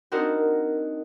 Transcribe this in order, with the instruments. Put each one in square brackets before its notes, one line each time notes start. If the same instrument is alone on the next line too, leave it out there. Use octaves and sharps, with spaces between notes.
[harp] C4 D4 D#4 F#4 A#4